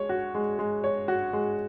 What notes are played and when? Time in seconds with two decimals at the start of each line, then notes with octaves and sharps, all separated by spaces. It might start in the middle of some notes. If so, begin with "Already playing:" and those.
Already playing: G#3 C#5
0.09 F#4
0.35 G#3
0.59 G#3
0.84 C#5
1.08 F#4
1.33 G#3